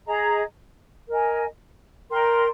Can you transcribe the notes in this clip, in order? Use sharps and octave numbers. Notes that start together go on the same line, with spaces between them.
G#4 D#5 A#5
A#4 D#5 G#5
A#4 D5 G5 C6